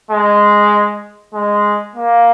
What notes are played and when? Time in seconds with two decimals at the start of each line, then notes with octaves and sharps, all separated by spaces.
0.11 G#3
1.34 G#3
1.96 A#3